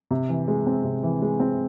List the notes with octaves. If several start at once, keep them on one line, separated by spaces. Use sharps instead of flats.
C3
E3
G#3
C4
C3
E3
G#3
C4